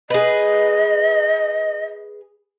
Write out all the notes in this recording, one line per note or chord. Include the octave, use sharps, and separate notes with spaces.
G#4 B4 D#5